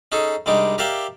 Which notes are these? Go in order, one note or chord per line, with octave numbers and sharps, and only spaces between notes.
C#4 D#4 G#4 A4
C2 G3 G#3 D4 D#4 D6
G4 A#4 D5 E5 F5 G5